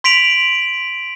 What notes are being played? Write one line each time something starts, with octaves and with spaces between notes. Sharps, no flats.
C6 B6 D7 F7 F#7